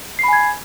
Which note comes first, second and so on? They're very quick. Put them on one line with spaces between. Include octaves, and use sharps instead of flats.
C7 B5 G#5 G#6